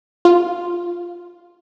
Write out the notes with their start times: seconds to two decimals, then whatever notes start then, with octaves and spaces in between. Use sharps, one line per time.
0.25 F4